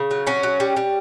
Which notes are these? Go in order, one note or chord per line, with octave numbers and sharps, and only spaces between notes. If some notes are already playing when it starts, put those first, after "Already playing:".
Already playing: C#3
F#3
F#3 C#4
F#3
G3
G3